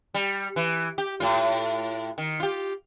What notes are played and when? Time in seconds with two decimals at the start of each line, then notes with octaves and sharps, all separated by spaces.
0.14 G3
0.56 E3
0.98 G4
1.20 A2 F4
2.18 D#3
2.40 F4 G4